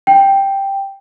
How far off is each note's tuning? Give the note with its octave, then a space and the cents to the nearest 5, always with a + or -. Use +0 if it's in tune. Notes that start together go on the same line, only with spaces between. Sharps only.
G5 +0